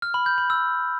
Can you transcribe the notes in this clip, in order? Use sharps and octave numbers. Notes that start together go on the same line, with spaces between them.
F6
B5
G6
B5
E6